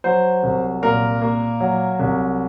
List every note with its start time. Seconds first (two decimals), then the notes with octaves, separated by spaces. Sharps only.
0.04 F#3 C5
0.43 C2
0.82 A#2 A#4
1.21 A#3
1.60 F#3
1.99 C2